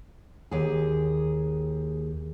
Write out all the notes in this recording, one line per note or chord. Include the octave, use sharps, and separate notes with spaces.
D#2 G#4